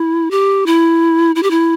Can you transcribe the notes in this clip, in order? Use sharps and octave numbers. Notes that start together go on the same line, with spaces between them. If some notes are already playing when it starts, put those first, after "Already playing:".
Already playing: E4
G4
E4
E4
G4
E4